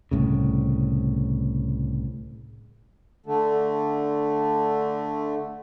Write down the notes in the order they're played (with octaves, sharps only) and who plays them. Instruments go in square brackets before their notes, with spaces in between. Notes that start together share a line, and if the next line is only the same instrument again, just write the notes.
[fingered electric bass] C2 A2 C#3
[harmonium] D3 A3